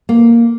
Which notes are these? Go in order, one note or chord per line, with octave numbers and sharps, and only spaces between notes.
A#3